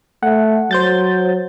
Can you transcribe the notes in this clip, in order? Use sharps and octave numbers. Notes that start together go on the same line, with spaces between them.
A3 F#5
F#3 C5 G6 A6